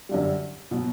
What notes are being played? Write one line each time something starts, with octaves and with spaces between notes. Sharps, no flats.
F#2 D3 G3
B2 F#3